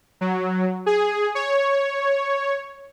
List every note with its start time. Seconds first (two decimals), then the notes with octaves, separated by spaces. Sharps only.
0.21 F#3
0.86 G#4
1.35 C#5